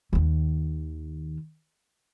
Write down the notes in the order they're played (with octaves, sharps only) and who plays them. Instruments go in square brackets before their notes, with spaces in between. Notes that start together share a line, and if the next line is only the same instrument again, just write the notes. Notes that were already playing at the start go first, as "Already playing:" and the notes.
[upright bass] D#2 D#3